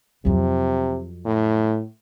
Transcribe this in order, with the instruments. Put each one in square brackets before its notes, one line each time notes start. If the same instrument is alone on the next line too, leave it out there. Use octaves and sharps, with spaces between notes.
[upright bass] F2 F#3 [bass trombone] C3
[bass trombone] A2